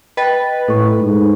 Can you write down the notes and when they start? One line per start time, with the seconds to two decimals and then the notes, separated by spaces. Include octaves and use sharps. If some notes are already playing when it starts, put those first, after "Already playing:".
0.17 B4 D#5 G5 A6
0.68 A2 A4 C#6
1.01 G#2